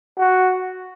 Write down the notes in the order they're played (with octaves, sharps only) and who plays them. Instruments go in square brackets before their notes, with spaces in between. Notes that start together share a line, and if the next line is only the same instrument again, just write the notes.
[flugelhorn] F#4